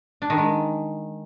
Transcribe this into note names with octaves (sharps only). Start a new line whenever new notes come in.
D4
D#3
G#3